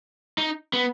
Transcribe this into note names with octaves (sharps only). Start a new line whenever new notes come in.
D#4
B3